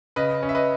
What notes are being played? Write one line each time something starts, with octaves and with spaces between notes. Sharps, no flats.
C#3 B4 D#5
C#4
E5
B4 D#5